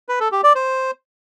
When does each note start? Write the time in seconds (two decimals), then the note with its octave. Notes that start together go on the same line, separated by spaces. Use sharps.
0.09 B4
0.20 A4
0.32 G4
0.44 D5
0.55 C5